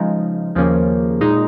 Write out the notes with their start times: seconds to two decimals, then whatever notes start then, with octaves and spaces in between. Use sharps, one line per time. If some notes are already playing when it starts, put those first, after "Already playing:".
Already playing: C#3 F3 G#3 D#4
0.55 D#2 C#3 F3 A#3 C#4
1.21 A#2 G#3 D#4